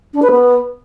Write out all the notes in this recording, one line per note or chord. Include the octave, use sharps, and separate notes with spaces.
D4
B4
B3